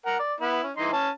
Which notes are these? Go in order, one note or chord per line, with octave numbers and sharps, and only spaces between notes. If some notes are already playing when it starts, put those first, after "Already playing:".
A#4 F#5
D5
B3 E4
C#4
E3 D#4 C6
C#4 A5